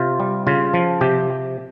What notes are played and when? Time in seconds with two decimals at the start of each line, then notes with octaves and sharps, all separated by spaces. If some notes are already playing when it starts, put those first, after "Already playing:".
Already playing: C3 F4
0.20 G3
0.47 C#3 F4
0.74 F3
1.01 C3 G4